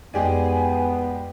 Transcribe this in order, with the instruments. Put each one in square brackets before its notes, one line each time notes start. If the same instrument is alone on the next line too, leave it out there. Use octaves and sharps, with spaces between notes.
[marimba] F2 [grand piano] G#3 G4 D5 [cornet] B3 [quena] G#5